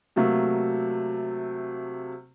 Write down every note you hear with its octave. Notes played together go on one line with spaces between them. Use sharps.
C3 F#3 A3 A#3